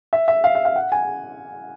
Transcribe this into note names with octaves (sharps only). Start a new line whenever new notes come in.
E5
E5
F5
E5
F5
F#5
G#5